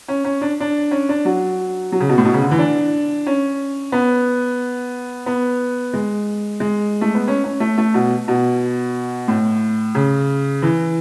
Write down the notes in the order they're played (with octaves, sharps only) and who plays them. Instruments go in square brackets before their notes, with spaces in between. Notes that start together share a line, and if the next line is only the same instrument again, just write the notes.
[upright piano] C#4
C#4
D4
D4
C#4
D4
F#3
F#3
C#3
B2
A2
B2
C#3
D3
E3
D4
C#4
B3
B3
G#3
G#3
A3
B3
C#4
C#4
A3
A3
B2
B2
A2
C#3
E3